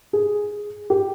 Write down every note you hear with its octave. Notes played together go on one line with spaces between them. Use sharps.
G#4
G4